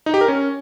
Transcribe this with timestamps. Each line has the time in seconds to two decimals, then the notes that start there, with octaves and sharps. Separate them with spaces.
0.06 D#4
0.14 G4
0.21 A#4
0.28 C#4